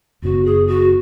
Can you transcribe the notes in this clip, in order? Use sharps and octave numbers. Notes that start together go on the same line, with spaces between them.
F#1 F#2 C#3 B3 F#4
G#4
F#4